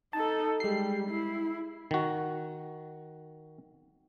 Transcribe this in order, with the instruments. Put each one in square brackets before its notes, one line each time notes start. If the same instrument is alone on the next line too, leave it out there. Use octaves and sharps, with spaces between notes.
[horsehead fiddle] D#4 A4 [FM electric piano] A5
[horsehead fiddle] G3 [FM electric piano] G#3 C7
[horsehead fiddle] E4
[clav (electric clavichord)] D#3 F#4